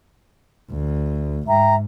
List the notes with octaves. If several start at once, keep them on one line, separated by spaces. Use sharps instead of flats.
D2
G#2 E5 G5 A#5